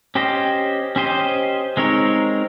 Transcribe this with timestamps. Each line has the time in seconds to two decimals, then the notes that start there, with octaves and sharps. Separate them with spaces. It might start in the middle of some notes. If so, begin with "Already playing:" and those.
0.15 C#4 G4 C5 D#5
0.96 C#4 G4 C5 D#5
1.77 G#3 C4 D#4 A#4 C#5